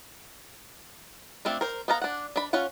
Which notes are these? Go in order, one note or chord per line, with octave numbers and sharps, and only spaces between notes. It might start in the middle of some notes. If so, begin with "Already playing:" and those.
A3 C4 D4 F4
A#4 C5
B3 A4 F5 A#5
D4 F#5
D4 B5
C#4 F4 C#5 F#5